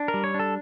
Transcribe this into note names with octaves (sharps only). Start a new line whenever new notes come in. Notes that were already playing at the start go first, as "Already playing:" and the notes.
Already playing: D4
A#4
G3
C#5
D4
A4